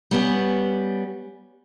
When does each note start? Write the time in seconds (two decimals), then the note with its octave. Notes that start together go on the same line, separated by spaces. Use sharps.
0.11 G3 B3 C#4